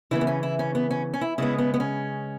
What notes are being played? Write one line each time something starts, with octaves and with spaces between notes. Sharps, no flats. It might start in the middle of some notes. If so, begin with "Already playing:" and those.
C#3 E3 B3 E4
B3
C#4
E4
C#4
B3
C#4
C#4
E4
C#3 G#3 B3 E4
B3
B3
C#4